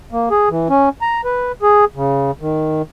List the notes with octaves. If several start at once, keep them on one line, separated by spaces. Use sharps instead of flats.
A#3
G#4
E3
C#4
A#5
B4
G#4
C#3
D#3